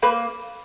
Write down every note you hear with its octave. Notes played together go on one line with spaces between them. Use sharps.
A#3 B4